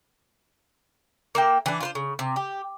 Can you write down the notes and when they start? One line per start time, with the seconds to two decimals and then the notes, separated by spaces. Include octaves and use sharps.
1.35 A#3 E4 G5
1.66 E3 D4
1.80 F4 B4 C5
1.95 C#3
2.19 C3
2.36 G4